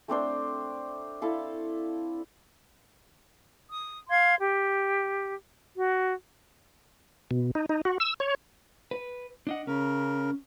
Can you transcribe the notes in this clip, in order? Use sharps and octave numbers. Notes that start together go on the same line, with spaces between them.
A3 C4 D4 C5
E4 A4 F5
D#6
F5 C6 G#6
G4
F#4
B2
D#4
D#4
F#4
E6
C#5
B4
D4 D#5 F#5
C#3 C#4 A#4